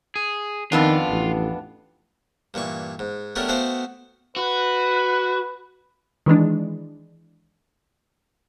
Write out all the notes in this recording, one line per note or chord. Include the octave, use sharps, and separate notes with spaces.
G#4
F2 D#3 B3 D4 F4
A1
G2 A#2 E3 C#6
G#2
A3 B3 C#4 D4 G4 A#4
A3 B3 F#4 C5 F5 G5
F#4 B4
D#3 E3 G#3 D4